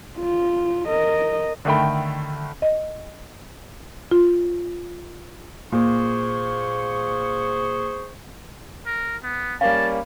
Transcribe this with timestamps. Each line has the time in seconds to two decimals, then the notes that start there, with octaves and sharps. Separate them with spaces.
0.18 F4
0.87 A#4 D#5
1.65 D3 D#3 A3 G5 B5
2.62 D#5
4.11 F4
5.72 A#2 G#4 C5 C#6
8.86 A#4
9.23 B3
9.61 G3 A#3 C#4 F5 A5